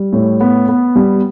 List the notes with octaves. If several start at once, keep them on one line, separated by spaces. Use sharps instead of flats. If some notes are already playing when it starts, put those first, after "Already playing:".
Already playing: G3
A2
B3
B3
G3